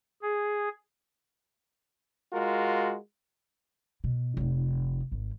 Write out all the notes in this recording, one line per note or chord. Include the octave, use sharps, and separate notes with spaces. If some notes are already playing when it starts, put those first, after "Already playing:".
G#4
G#3 F4 F#4 A#4
B2
F1 D#4
G#1